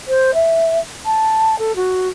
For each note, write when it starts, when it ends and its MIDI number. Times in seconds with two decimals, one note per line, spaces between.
0.07 0.31 72
0.34 0.78 76
1.05 1.58 81
1.58 1.75 69
1.75 2.08 66